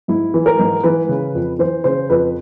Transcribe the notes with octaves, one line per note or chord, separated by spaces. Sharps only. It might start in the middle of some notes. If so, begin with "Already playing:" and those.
G#2 E4
E3
A#4
G#2
E3 B4
C#3
F2
E3 C5
C#3 C5
F2 B4